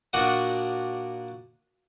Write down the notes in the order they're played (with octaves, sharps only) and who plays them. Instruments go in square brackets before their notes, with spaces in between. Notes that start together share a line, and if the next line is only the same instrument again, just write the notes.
[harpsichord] A#2 D4 F#4 F#5 D#6